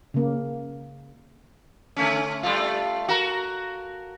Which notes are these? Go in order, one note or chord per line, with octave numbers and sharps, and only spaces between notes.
C#3 A#3
D3 A3 C#4
G3 A3 F4
F#4 A#4